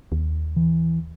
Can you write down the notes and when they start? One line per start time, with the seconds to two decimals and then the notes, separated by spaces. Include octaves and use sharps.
0.12 D#2
0.56 E3